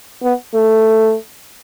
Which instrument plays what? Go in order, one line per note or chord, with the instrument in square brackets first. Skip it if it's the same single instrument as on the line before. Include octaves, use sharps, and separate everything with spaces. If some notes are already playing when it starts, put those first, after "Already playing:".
[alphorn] B3
A3